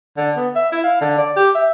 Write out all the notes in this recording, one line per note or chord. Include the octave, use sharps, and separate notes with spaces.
D3
B3
E5
E4
F5
D3
D5
G4
E5